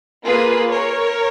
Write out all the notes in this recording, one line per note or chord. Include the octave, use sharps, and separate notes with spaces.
A#3 F4 G#4 B4
A#4 C#5